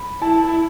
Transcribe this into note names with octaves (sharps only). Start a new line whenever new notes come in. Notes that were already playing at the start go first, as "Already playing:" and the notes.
Already playing: B5
E4 A5